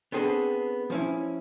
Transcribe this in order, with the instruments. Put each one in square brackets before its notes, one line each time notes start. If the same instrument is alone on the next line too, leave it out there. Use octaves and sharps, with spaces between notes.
[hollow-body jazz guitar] B3 C4 D4 G#4 A4
F3 C#4 E4